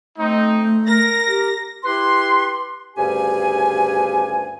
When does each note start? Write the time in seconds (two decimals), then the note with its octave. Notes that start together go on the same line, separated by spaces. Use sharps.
0.18 A3 C4 D#4
0.87 A#4 A#6
1.27 G4
1.84 E4 G4 B4 C6
2.97 D2 G2 C#3 G4 G#5